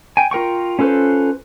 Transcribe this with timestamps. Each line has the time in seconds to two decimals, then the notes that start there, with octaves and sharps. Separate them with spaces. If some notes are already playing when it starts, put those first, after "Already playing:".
0.17 G5 G#5
0.31 F4 A#4 G5 C#6
0.79 C#4 F4 A4 B4 C5